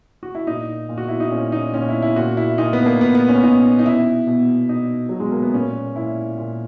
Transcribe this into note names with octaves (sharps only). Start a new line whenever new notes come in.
F#4
E4
A#2 D#4
A#2
F#4
E4
D#4
A#2 C#4
D#4
A#2 C#4
E4
E4
A#2 F#4
E4
A#2 D#4
B3
A#3
A#2 B3
B3
C#4
A#2 D#4
D#4
B2 E4
B2
B2 D#4
B2 F#3
G#3
A#3
B3
A#2 C#4
A#2 E4
A#2